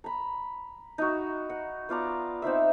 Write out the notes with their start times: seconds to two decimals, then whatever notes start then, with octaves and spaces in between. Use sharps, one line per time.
0.04 A#5 B5
0.98 D#4 F#4
1.50 F#5
1.89 B3 F4 D5 A#5
2.42 C4 D#4 C5 E5